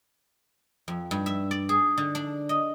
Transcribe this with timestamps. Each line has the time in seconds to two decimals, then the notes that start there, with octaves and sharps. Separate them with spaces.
0.88 F2
1.11 G2
1.26 E5
1.51 D5
1.69 G#4
1.98 D3
2.15 D4
2.49 D#5